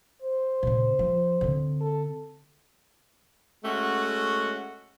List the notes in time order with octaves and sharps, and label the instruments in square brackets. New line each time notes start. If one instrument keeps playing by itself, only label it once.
[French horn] C5
[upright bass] A#2 C#3
F3
D3 C4
[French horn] A4
[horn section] G#3 A3 C#4 F#4